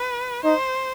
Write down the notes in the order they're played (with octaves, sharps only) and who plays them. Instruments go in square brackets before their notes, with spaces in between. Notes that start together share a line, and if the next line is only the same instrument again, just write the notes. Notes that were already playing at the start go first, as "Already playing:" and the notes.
Already playing: [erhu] B4
[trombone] D#4 [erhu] C5